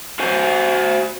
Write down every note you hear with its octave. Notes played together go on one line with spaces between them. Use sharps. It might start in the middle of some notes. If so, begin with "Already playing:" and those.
F#4 C5 G#5